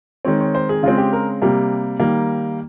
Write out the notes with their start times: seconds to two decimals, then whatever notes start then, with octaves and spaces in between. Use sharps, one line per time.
0.25 D#3 G#3 C4 C#5
0.40 C#5
0.55 C5
0.69 G#4
0.83 C#3 G#3 C4 F4
0.98 G4
1.13 A#4
1.42 C3 G3 A#3
2.00 D#3 G3 A#3